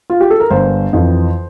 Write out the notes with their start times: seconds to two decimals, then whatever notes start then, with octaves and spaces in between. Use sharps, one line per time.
0.10 F4
0.21 G4
0.30 A4
0.40 A#4
0.51 G1 C5
0.93 F2 E3